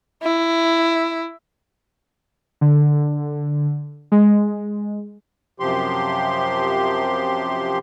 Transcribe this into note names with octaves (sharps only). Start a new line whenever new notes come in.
E4
D3
G#3
F#2 C3 F3 G4 C6